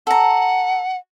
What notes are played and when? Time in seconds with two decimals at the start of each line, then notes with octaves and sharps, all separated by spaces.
0.07 A4 F#5 A#5